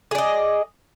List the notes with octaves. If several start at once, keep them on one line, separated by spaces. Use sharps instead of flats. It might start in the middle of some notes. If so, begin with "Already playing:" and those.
G#4 D5 D#5